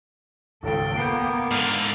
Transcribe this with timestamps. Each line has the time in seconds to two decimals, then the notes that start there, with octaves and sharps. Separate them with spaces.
0.63 D#1 G#1 C#2 A4 G5
0.97 A#3 B3 G6 C7
1.51 G#2 D3 A4 F6